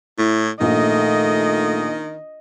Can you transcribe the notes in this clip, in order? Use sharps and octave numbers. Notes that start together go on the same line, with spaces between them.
A2 E4
A#1 D#3 A3 D#5